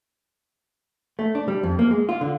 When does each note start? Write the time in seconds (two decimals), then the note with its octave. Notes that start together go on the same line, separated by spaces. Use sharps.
1.19 A3
1.35 D4
1.48 G3
1.63 F2
1.79 A#3
1.91 G#3
2.09 F4
2.21 D3